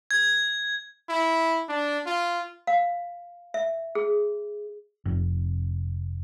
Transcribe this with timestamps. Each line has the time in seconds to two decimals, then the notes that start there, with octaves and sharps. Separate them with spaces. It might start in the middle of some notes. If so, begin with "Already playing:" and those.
0.11 G#6
1.09 E4
1.69 D4
2.06 F4
2.67 F5
3.54 E5
3.95 G#4
5.05 F1